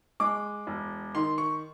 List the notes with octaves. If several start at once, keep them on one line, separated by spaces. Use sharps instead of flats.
G#3 D6
E1
D#3 C6
C#6